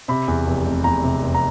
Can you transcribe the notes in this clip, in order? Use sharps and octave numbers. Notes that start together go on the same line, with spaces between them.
C3 B5
E2
F1
F1
E2 A#5
C3
F1
A#5